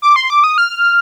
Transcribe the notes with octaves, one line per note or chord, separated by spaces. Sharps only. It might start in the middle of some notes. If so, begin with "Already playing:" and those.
D6
C6
D6
D#6
F6